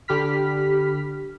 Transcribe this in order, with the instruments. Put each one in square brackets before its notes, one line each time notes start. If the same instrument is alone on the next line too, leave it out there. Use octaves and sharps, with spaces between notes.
[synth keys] D3 G4 B5 F6 B6